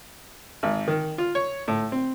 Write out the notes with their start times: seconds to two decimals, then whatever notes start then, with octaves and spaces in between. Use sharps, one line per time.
0.63 G#1
0.88 D#3
1.18 F4
1.35 C#5
1.68 A2
1.92 C4